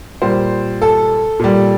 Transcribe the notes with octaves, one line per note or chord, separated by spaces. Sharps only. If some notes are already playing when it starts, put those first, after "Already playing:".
A#2 G3 C5
A4
A#2 G3